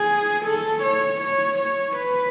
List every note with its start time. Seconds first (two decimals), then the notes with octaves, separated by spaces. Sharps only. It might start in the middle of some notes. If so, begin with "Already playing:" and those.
Already playing: G#4
0.45 A4
0.83 C#5
1.21 C#5
1.58 C#5
1.96 B4